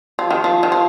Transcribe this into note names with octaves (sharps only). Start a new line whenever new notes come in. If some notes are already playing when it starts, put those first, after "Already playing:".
F3
D#3
F3
D#3
F3